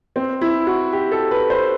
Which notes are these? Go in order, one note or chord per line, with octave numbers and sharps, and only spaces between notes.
C4
E4
F#4
G4
A4
B4
C5